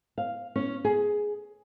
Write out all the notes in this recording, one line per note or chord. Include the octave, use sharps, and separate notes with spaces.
F5
C#4
G#4